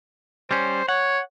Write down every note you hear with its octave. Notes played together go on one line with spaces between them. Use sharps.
G3 C#4 C5
C#5 F#5